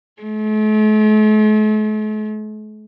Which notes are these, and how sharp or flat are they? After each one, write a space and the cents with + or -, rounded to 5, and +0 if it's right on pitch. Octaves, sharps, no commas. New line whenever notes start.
A3 -45